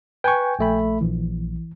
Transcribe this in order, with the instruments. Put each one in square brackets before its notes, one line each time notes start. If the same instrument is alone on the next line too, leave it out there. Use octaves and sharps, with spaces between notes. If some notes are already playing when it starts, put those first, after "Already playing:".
[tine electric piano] B4 C#6 [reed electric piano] G5 G#5
[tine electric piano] A#1 A3 B5
[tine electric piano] A#1 [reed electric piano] E3